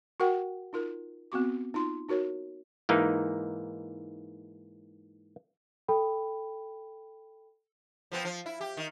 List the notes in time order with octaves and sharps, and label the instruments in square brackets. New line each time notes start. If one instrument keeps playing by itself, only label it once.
[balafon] F#4 A#4 F#5 G5
D#4 F4 A#4
B3 C4 F#4 D6
D#4 F4 C6
D#4 F#4 A#4 C#5
[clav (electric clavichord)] G#2 E3 A#3 D#4
[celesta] A4 G5 B5
[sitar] F3 B3 C4
F3
E4
G4
D#3